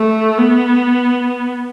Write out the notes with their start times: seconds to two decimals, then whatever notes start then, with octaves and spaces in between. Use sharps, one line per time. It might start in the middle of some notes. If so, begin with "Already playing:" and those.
Already playing: A3
0.38 B3